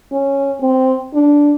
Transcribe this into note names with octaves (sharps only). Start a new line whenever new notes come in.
C#4
C4
D4